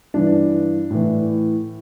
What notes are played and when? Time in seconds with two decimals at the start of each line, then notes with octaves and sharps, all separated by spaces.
0.14 G2 E3 D4
0.90 A2 E3